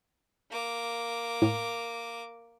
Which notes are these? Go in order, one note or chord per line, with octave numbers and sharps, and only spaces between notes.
A#3 D6
A2